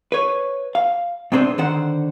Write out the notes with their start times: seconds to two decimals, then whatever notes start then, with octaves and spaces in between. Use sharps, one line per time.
0.12 B4 C#5
0.75 F5
1.32 G#2 C3 B3 C4 D4 C5
1.58 D3 D#3 C5 F#5